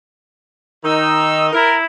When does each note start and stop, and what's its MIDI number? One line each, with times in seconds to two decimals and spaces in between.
0.85 1.48 51
0.85 1.48 63
0.85 1.46 88
1.53 1.85 64
1.53 1.75 70